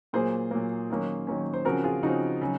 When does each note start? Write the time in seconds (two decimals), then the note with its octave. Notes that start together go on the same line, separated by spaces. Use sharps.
0.13 A#2 F#3 A#3 G#4 C5
0.51 A#2 F#3 A#3
0.90 D#3 F#3 A#3 C#4
1.27 D#3 F#3 A#3 C#4
1.54 C5
1.65 C#3 F3 C4 F#4 A#4
1.84 F4 G#4
2.03 C#3 F3 C4 D#4 F#4
2.41 C#3 F#3